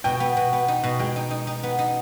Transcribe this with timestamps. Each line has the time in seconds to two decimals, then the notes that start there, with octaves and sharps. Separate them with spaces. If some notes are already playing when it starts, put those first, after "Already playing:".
0.04 B2 G5
0.20 B3
0.37 B2
0.53 B3
0.68 D#4
0.84 B2
0.99 G#3 G5
1.16 D#4
1.31 D#4
1.47 D#4
1.63 B3
1.79 D#4